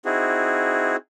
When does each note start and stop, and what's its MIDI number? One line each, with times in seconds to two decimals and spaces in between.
0.05 0.96 60
0.05 0.96 63
0.05 0.96 64
0.05 0.96 66
0.05 0.96 68